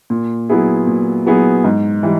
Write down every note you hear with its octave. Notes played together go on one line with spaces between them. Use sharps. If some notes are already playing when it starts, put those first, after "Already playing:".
A#2
F#3 B3 E4 G#4
A#2
F#3 B3 E4 G#4
G#2
E3 G3